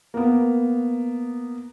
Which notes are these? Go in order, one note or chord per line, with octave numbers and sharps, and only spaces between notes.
A#3 B3